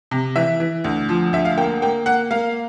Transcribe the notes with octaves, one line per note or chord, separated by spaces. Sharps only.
C3
E3 E5
E3
D2
F3
D2 E5
F5
A#3 G5
A#3 G5
A#3 F#5
A#3 F5